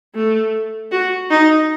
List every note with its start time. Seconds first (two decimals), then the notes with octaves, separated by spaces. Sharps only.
0.15 A3
0.92 F#4
1.30 D#4